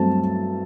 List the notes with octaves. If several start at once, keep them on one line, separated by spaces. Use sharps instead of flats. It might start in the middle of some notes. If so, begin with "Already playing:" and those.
Already playing: G2 F#3 A3 C4 A5